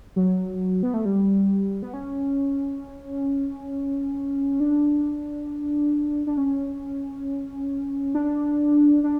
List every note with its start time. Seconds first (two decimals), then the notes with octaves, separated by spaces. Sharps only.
0.16 F#3
0.83 B3
0.94 A3
1.05 G3
1.83 B3
1.94 C#4
4.60 D4
6.27 D4
6.37 C#4
8.15 D4
9.04 D4